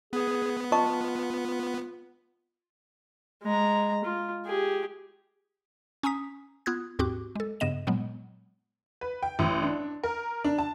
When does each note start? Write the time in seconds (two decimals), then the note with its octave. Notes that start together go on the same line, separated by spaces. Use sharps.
0.13 B3 G#4
0.72 F4 D#5 A5 C#6
3.43 G#3 A#5
4.04 F4
4.46 G4 G#4
6.03 C#4 G#5 A#5 D#6 B6
6.66 B3 F4 D#6 F#6 G#6
6.99 D#2 G#2 C4 F#4 G4 D6
7.36 G#3 A4
7.60 G2 C#3 B3 D#5 E7
7.87 A#2 F#3 G#3 B3
9.01 B4
9.23 G5
9.39 A1
9.62 D4
10.03 A#4
10.44 D4
10.58 A5